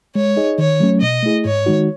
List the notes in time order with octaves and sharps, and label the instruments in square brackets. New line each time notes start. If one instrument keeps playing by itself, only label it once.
[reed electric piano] G#3 [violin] C#5
[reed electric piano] D#4 G#4 D#5
[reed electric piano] D#3 [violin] C#5
[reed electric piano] F#3 A3 C#4
[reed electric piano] B2 [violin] D#5
[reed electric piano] A3 E4 G#4
[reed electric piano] G#2 [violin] C#5
[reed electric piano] D#3 G#3 D#4 F#4